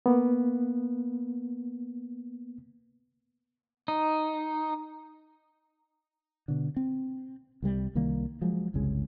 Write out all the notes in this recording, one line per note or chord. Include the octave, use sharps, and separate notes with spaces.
A#3 B3
D#4
B2 D3
C4
C2 C3 G3
C2 D#3 G3 A#3
F3 F#3 G#3
F#1 C2 C#3 G#3